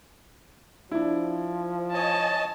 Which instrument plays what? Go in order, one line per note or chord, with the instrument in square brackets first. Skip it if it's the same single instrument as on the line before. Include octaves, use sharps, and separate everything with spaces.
[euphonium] F3 [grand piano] D4 E4
[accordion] C#5 D#5 G#5 [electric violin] A5